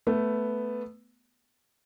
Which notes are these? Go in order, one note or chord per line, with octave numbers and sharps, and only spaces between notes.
A3 B3